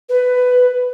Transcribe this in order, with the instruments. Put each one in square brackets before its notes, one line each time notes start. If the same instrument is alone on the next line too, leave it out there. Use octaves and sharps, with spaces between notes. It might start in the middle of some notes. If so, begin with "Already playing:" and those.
[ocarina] B4